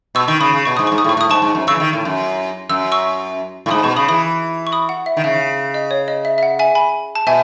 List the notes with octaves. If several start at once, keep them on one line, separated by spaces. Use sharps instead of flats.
B2 C#6 E6
D#3 C#6
C#3 B5 D#6
C#3
B2 C#6
G#2 D#6
G#2 C#6
D#6
A2
C#6
A2 D#6
G#2 A5 C#6
G#2
F#2
C#3 C#6 E6
E3
D#3
A2
F#2
F#2 E6
C#6 E6
A2
G#2 B5 D#6
B2 A5 C#6
C#3 B5 D#6
E3 B5 D#6
C#6
B5 D#6
F#5
E5
D#3
C#3 E5
D#5
C#5
D#5
E5
E5
F#5
E5 G#5
G#5 B5
A5
B2 E5 G#5